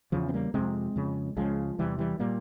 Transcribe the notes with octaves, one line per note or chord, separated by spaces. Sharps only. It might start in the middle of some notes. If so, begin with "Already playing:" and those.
E2 C#3 F3
C4
G3 A#3
F2 C3 G#3 C4
F2 C#3
C#2 C#3 F3 G#3
E2 C3 E3 G3
E3 G3
A#2 G3 A#3